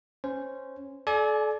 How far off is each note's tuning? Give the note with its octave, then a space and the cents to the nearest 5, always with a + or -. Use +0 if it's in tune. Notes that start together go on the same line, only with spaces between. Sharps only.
C#4 -10 C5 -15
A4 -35 D5 +0 G#5 +35